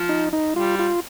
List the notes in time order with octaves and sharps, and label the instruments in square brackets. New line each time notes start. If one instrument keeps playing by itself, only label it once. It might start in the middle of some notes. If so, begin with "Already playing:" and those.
Already playing: [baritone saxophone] F3
[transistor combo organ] D#4
D#4
[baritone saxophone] G3 [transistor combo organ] F4
[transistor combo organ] F4